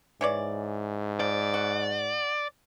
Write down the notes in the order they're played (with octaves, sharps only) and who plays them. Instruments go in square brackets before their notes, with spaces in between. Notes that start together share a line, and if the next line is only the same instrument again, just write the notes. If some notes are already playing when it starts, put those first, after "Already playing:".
[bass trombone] G#2 [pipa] E3 C#5 D5
[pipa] F3 [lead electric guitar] D5
[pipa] F#4